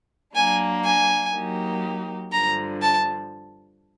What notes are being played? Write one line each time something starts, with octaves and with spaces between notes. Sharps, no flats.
F#3 A#3 D4 G#5
G#5
F#3 A#3 D#4 G4
G2 D3 F3 A#5
A5